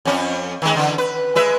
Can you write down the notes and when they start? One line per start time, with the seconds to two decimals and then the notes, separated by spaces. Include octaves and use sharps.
0.05 F2 C#4
0.62 D#3 G#3
0.76 D3 E3
0.98 B4
1.35 G#3 B4 E5